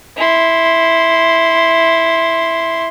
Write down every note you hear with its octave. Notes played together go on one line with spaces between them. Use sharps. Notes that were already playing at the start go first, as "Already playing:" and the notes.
E4 C6